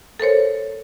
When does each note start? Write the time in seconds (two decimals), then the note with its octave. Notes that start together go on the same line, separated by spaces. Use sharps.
0.20 A4 A#4 C5 C#5